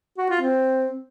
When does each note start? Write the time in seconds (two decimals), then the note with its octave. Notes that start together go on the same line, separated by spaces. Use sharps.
0.18 F#4
0.29 F4
0.41 C4